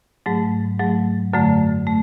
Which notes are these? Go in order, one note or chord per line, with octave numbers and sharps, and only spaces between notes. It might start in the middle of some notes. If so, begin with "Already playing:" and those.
G#2 F#3 A3
G#2 F#3 A3
F#2 D3 F#3 A3
A3